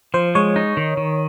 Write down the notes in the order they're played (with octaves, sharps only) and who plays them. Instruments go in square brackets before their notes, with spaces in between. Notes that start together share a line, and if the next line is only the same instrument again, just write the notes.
[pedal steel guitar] F3 [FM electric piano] C5
[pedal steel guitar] G#3 [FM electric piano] C#5
[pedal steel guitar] D#4
D#3
D#3